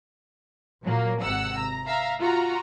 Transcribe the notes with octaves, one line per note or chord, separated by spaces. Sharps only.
A#2 F#3 A#3
G#1 C3 F#5 E6
A#5
E5 F5 A#5
F4 F#4 A#5